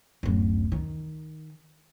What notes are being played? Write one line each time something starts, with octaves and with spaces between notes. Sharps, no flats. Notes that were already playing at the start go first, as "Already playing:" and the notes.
D1 F#2
D#3